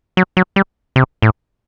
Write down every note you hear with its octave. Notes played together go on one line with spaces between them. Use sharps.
F#3
F#3
G3
C3
A2